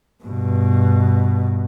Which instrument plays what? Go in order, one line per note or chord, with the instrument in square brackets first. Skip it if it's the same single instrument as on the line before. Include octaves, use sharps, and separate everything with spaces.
[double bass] G2 B2